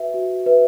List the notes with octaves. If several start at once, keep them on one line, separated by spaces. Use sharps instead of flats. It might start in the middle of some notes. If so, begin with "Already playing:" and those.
Already playing: F#4 B4 E5
F#4
B4 E5